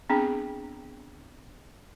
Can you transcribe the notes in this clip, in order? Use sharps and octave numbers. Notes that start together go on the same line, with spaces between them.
B3 C4 D4 G#4 G5